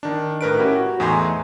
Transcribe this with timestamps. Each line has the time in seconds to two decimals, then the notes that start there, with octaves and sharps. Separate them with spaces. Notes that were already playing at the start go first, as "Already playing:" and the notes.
0.03 D#3 D4
0.41 A2 A#4 B4 D7
0.58 C#4 E4 F#4 G4 A#4
0.76 F#4
1.00 E2 A2 D#4 G#5 A#5 C6